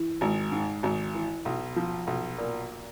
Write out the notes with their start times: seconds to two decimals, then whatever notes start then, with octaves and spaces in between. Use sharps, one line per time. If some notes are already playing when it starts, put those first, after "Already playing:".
Already playing: E3
0.21 G#1
0.52 G#2
0.83 G#1
1.15 E3
1.45 B1
1.76 F3
2.07 B1
2.38 A#2